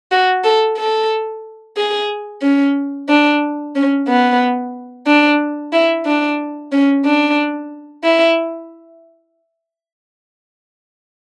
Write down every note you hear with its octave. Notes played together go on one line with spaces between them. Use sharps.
F#4
A4
A4
G#4
C#4
D4
C#4
B3
D4
E4
D4
C#4
D4
E4